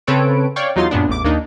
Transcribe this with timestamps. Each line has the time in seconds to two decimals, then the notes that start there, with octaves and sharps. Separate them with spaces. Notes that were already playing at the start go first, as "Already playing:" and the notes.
0.07 C#3 C4 A4 B4 C#5 D7
0.56 C#5 D5 F5 G5 C#6
0.76 E2 F#3 D#4 F4 C6 A6
0.91 F#2 A#2 B3 D4
1.08 A1 E2 D6
1.24 D#2 A#3 D4 D#4